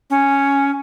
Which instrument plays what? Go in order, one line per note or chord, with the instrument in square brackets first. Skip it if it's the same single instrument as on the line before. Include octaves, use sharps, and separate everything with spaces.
[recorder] C#4